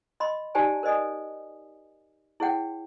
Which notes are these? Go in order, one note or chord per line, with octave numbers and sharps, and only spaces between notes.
D#5 B5 C6
D#4 G4 C5 D5 G#5 A5
A#4 C5 D5 D#5 G#5 D#6
E4 G#4 C#5 F#5 G5